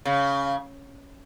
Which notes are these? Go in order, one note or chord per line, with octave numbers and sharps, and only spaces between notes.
C#3